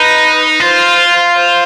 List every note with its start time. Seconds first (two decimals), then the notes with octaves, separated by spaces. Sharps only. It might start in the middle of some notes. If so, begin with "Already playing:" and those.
Already playing: D#4 B4
0.60 F4 C5
1.35 C5